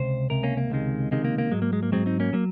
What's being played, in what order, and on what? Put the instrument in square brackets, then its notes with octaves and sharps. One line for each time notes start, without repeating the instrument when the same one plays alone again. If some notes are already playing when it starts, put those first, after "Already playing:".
Already playing: [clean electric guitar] C#2 C3 C5
C#2 C3 A#4
A#3 C#4
A#3
C#2 C3 D#3 G#3
C#2 C3 D#3 G#3
A#3
A#3
G#2 F#3 G#3
A#3
G#3
A#3
G#2 F#3 G#3 C4
C4 D#4
A#3 C#4
F#3 A#3